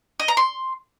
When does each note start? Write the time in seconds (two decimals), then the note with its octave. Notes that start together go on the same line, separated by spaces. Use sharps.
0.20 D#5
0.28 A#5
0.37 C6